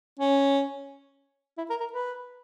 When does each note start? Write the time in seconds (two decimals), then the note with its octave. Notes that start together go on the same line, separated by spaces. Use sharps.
0.20 C#4
1.58 E4
1.70 A#4
1.80 A#4
1.93 B4